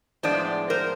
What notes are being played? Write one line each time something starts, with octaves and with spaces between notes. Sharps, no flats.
A2 F3 G#3 B3 D4 C5 D5
A#4 C5